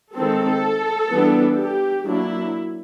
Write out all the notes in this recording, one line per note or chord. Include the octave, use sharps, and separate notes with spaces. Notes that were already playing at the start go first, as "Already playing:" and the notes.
D#3 G#3 C4 A4
E3 G3 B3 D4
G4
F#3 A#3 D4 E4